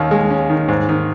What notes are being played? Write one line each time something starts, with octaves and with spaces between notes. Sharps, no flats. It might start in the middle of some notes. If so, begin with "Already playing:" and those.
Already playing: D#2 D#3 C#4
G#3
C#4
D#3
G#2
D#3